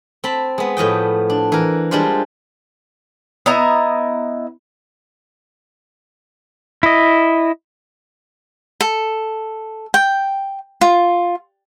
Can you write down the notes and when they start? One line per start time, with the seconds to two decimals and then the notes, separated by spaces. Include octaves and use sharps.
0.24 C4 A5 B5
0.58 G#3 B3
0.77 A2 F3 D#5 G5
1.30 D4
1.52 E3 A#4
1.91 G3 G#3 D4 F4 C5
3.46 B3 E4 D#5 A#5
6.83 E4 D#5
8.81 A4
9.94 G5
10.81 F4